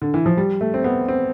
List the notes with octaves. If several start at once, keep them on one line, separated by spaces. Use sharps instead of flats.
D3
E3
F3
G3
A3
C4
B3
C4